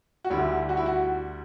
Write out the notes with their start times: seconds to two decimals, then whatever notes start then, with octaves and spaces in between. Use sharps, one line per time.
0.25 F#4
0.30 D2 D3 G3 E4
0.69 F#4
0.77 E4
0.86 F#4